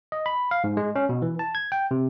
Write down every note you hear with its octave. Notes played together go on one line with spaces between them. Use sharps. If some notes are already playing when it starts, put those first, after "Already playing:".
D#5
B5
F5
G#2
G#3
C#4
B2
E3
A5
G#6
G5
C3